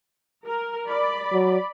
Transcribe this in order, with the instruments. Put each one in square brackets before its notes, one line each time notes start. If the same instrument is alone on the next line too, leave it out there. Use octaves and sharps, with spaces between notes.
[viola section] A#4
D5 B5
[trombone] F#3